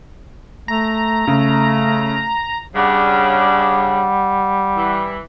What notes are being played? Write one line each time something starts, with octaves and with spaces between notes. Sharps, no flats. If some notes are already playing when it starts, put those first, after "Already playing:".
A3 A#5
C#3 A3
C#3 G3 D4 F#5
E3